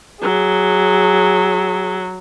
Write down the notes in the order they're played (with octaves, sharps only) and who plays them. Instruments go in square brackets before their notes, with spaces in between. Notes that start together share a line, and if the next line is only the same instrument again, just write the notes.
[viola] F#3 [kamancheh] G#4